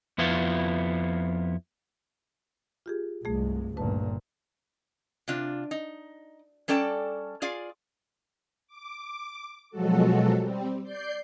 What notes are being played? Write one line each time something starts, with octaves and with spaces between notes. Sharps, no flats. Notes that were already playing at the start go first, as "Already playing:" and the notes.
F2 B3 E4 F4
F4 G4 G#4
C2 G2 G#3 A3 G#4
G1 D2 G2 A#2 C#3 B4 A5
C3 D4 F4
D#4
G3 C#4 A4 D5 G5 A5
F4 G#4 D5 F5
D6
B2 F3 F#3 G#3 F#4 A4
G3 C4
D5 G6 C7